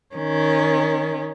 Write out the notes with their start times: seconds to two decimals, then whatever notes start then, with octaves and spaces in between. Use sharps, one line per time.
0.15 D#3 C#4